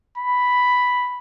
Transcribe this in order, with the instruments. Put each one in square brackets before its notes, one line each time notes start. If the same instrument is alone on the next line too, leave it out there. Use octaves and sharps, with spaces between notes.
[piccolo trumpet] B5